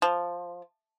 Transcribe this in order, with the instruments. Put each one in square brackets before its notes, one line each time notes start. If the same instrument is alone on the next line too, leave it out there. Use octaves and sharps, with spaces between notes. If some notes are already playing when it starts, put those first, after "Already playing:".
[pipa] F3